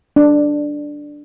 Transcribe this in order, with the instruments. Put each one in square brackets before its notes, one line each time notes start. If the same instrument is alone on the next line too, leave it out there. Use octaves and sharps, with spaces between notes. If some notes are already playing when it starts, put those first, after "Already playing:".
[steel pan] D4